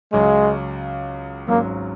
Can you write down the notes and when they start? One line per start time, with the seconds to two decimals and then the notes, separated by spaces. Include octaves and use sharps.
0.13 C#2 C#3 F#3 G#3 C#4
1.48 G#1 G#2 F#3 A#3 C#4